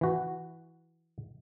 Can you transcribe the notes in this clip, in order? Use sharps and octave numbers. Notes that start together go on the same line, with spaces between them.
E3 F#4